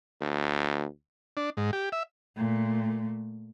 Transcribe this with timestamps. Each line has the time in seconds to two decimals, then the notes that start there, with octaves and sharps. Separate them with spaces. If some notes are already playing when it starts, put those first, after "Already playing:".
0.21 D2
1.37 D4
1.57 G#2
1.73 G4
1.92 E5
2.37 A#2 A3